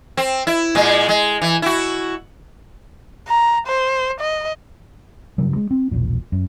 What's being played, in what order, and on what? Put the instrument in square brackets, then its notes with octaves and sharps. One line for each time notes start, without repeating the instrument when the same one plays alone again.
[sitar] C4
E4
A#2 G#3
G#3
E3
E4 F#4
[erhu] A#5
C5
D#5
[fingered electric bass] G2 C#3 F#3
G#3
C4
E1 A#1 A#2
F#2